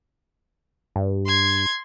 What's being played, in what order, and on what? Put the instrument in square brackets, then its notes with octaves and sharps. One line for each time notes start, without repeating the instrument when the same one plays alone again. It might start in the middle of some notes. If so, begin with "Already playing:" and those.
[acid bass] G2
[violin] C6 G#6